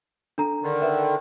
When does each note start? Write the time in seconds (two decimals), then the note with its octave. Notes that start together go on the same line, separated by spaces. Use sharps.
0.38 D4 A4 A#5
0.63 D3 D#3
0.82 B4 E5